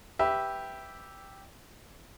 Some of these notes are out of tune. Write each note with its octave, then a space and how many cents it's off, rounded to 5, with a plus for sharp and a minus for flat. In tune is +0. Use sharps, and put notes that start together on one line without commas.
G4 +0 B4 +0 E5 +0